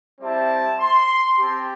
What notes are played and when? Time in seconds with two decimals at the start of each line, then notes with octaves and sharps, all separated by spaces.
0.21 G3 C4 E4 G4 A5
0.80 C6
1.39 C4 G4 A5